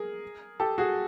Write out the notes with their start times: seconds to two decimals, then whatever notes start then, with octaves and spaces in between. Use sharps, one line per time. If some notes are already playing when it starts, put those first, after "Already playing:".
Already playing: G#4 A#4
0.60 G4 A4
0.78 F#4 G#4